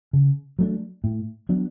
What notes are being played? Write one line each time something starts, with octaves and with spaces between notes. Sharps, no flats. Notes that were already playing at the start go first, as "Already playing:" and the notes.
C#3
F#3 A3 D4
A2
F#3 B3 D4